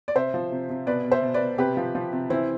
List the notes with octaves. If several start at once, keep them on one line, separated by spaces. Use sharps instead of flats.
D5
C3 C5 E5
F3
C3
C3
B2 B4 D5
B2
C5 E5
B2
B4 D5
B2
C3 G4 B4
F3
F3
C3
E3 C4 E4